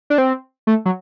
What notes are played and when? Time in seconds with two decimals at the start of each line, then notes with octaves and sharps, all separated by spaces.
0.10 D4
0.18 C4
0.67 A3
0.85 F#3